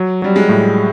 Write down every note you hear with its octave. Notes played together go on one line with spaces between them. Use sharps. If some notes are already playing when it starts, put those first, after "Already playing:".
Already playing: F#3
F#3 G3
G#3
A2